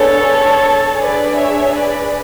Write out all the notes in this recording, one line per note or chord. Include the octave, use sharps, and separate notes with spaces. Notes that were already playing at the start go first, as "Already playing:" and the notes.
Already playing: B3 D4 G#4 A4 C#5
D4 G#4 B4 D5
C#5 E5
B4 D5